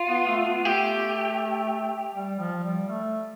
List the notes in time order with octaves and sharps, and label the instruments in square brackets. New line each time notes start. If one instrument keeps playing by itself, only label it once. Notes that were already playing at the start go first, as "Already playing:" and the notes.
Already playing: [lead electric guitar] F4
[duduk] B3
A3
B3
[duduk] A3 [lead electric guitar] G4
[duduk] G3
F3
G3
A3